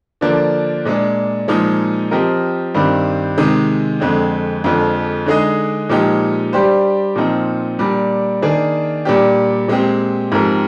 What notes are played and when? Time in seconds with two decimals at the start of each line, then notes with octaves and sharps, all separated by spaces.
0.21 D3 F3 A#3 D4
0.85 A#2 G#3 D4
1.48 A#2 F3 G#3 D#4
2.11 F3 C4 G4 A#4 D#5
2.75 G2 D#3 G3 C4
3.38 C3 D#3 G#3 D#4
4.00 F2 D3 G#3 C4
4.64 F2 D3 F3 G#3
5.26 D3 G#3 D#4 G#4 D#5
5.89 A#2 F3 G#3 D#4 G4
6.53 G3 D4 G4 C5
7.16 A#2 F3 C4 D#4
7.79 A#2 G3 D4
8.42 D#3 A#3 D4 G#4
9.05 A#2 G3 D4 G4
9.68 A#2 G#3 C4 G4
10.32 G#2 F3 C4 G4 A#4